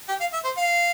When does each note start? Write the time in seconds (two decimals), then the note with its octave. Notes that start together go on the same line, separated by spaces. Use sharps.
0.08 G4
0.20 F5
0.33 E5
0.44 C5
0.57 F5